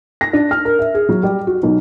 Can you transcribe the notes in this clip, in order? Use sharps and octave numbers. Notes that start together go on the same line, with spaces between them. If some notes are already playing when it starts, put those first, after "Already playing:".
A#6
D4
F6
A#4
E5
G#4
F#3
G3
F#4
B1